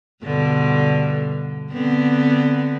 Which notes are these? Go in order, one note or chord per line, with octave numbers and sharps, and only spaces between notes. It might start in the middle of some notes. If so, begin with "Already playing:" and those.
G2 B2 D3
D3 B3 C4